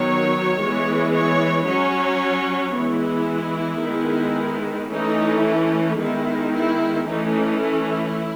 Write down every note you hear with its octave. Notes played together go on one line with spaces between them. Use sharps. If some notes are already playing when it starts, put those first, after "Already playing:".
Already playing: D#3 F#3 B3 C#5
E3 G#3 B3
C#5
F#3 C#4 C#5
E3 G#3 B3 E4
D#3 G#3 B3
E3 A3 C#4 D#4
E4
D#3 G#3 B3 E4
E4
E3 A3 C#4 D#4
E4